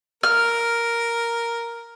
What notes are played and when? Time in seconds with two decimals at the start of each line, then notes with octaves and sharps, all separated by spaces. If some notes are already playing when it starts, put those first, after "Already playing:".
0.23 A#4 F6